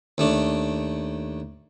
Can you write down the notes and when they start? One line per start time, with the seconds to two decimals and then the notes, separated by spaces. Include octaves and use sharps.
0.18 D#2 A3 D4